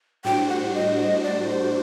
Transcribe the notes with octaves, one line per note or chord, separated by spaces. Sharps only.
A2 G3 D4 F#4 C5 G5
F#5
D#5
D#5
D5
C5